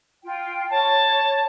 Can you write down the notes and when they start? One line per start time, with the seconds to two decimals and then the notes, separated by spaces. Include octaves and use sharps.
0.23 F4 G5
0.70 C#5 A5